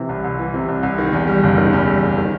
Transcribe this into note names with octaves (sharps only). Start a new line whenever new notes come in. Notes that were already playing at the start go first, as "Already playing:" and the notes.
Already playing: C3 E3
C2
C2
E3
C3
C2
C2
D#3
E2
G3
F#1
D#3
E2
G3
F#1
D#3